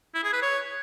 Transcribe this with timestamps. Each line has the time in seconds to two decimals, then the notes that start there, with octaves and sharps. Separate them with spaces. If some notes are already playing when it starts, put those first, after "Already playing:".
0.14 E4
0.24 G#4
0.33 B4
0.42 C#5